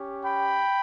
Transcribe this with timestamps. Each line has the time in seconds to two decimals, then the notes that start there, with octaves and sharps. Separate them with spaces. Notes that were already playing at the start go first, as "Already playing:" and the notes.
Already playing: C#4 G4
0.24 G5 B5